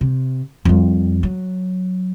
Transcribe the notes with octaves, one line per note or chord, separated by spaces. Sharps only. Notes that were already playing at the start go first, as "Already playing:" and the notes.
C3
F2 G3
F#3